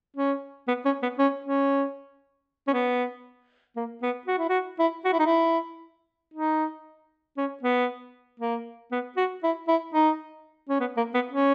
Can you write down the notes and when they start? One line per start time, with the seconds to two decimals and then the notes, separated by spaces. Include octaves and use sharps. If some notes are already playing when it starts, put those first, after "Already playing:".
0.17 C#4
0.68 B3
0.85 C#4
1.02 B3
1.19 C#4
1.44 C#4
2.67 C#4
2.73 B3
3.77 A#3
4.02 B3
4.27 F#4
4.38 E4
4.49 F#4
4.79 E4
5.05 F#4
5.13 E4
5.19 D#4
5.26 E4
6.34 D#4
7.37 C#4
7.63 B3
8.40 A#3
8.92 B3
9.17 F#4
9.43 E4
9.68 E4
9.94 D#4
10.69 C#4
10.80 B3
10.97 A#3
11.14 B3
11.32 C#4